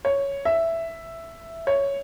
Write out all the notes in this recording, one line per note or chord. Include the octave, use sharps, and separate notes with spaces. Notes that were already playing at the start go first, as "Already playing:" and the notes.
C#5
E5
C#5